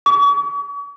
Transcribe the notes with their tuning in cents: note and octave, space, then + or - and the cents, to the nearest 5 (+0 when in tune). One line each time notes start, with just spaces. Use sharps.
C#6 +45